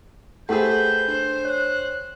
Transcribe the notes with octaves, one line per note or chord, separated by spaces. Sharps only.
A3 G4 G#4 B4 C5 F#5 G6
D4 C5
C#5 F#6